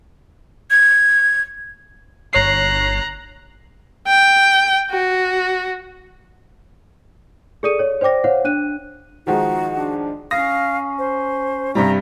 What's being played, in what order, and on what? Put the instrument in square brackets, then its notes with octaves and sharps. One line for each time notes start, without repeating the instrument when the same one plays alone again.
[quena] G#6
[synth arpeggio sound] G1 C#5 C7 [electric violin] A#5 F#6
[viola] G5
F#4
[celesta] G#4 A4 D5 D#6 C#7 D#7
C#5
C5 D5 G5 D6 A#6
C5 C#5 F5 F#5
D4 F#6 D#7
[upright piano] D#3 F3 G#3 [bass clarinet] D#4 [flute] F#4
[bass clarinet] D4
[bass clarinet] C#4 [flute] F5 [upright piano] D#6 A#6
[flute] C5
[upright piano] G2 C3 G3 [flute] A#5